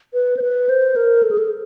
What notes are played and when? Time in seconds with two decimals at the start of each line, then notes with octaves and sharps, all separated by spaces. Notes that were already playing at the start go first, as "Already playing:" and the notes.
0.13 B4
0.37 C5
0.42 B4
0.69 C5
0.96 A#4
1.23 A4
1.31 G#4
1.38 A4